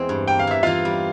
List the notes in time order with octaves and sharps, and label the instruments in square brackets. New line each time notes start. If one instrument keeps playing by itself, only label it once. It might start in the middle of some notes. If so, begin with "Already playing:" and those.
Already playing: [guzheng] E2 E3 G#3 C4
G2
[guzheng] A#3 [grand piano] G5
[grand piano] F5
[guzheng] E3 [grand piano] E5
[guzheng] E3 [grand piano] F4 F5
[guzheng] G3